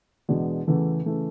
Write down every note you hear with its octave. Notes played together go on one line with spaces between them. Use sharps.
E2 B2 G#3 B3 D4
E2 C#3 E3 A3
C#3 E3 A3